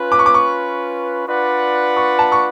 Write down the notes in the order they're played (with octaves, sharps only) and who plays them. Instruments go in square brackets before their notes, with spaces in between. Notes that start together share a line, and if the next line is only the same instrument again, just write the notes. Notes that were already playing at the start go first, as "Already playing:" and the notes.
Already playing: [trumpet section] C#4 F4 B4
[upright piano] D6
C#6
D6
C#6
[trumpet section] D4 F4 B4 D5 F#5
[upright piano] C#6
A5
C#6